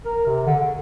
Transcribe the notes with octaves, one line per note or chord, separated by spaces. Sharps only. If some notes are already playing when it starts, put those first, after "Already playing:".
A#4
C3
D3
C#3